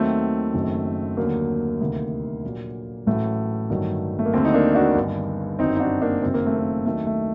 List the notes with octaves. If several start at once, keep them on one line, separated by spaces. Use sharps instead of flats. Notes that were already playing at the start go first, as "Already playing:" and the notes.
Already playing: D#2 D#3 F#3 A3 C4
F#1 F#2 D#3 F#3
D#2 D3 F#3 A#3
D2 C3 D#3
A#1 A#2 F#3
A1 A2 F#3 A3
G1 G2 D#3 F#3
A3
A#3
D#2 D3 F#3 A3 C4
D#4
A#3 D4
D4 F#4
G1 G2 D#3
G1 F#2 D#3 F#3 C4 D#4
D#4
D4 F#4
A#3 D4
F#1 F#2 D#3 F#3 C4
A#3
A3
A#3
D#2 D#3 F#3 A3
A3